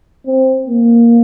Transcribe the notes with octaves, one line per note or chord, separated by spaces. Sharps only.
C4
A#3